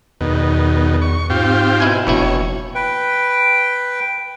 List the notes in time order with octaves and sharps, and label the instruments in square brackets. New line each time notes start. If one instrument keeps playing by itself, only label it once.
[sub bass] E2 [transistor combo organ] B2 D#3
[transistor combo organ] C#6
[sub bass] G#2 [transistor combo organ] C4 F4 G4
[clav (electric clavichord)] B2 E4 G#5
[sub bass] F1 [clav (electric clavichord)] A#1 B2 E4 [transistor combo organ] C#5
[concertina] B4 G5